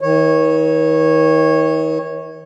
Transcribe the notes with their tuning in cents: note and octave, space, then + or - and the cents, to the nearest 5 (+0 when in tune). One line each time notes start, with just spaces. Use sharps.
D#3 +40 C#5 -15